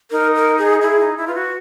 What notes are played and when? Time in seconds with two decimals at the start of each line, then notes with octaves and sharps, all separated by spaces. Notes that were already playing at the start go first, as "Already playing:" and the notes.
0.11 D#4 A#4
0.35 A#4
0.58 G#4
0.82 E4 G#4
0.99 D#4
1.17 E4
1.27 F4 B4
1.35 F#4